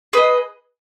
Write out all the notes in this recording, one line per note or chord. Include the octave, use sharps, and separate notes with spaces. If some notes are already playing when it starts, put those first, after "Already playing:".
G#4 B4 D#5